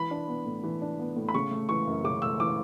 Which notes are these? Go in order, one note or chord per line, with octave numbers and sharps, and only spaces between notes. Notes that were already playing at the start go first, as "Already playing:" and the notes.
Already playing: E3 B5
D4
B3
A2
E3
D4
B3
A2
B5
C#3 C#6
A3
E3 C#6
F#2
C#3 D6
A3 E6
E3 D6